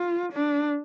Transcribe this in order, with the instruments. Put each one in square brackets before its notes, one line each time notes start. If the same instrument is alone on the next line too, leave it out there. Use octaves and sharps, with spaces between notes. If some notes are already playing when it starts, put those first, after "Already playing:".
Already playing: [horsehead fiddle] F4
D4